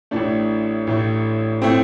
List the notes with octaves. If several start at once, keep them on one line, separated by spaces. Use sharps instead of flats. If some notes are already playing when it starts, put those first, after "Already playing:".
A1 A2 A3 D4
A1 A2 A3
A2 A3 C4